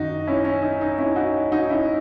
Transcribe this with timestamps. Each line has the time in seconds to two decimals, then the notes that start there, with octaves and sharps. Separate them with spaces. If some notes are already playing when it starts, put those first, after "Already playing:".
Already playing: F#2 D#3 D#4 F#4
0.27 C#4 E4
0.45 C#4
0.62 D#4
0.81 D#4
0.98 C#4 E4
1.16 D#4 F#4
1.52 D#4 F#4
1.70 C#4 E4